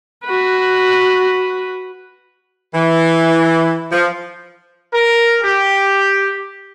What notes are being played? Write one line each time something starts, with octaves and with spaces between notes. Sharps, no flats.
F#4 B4
E3
F3
A#4
G4